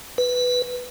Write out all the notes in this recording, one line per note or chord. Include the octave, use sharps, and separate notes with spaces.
B4